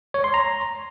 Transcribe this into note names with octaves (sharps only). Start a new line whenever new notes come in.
C#5
C6
A#5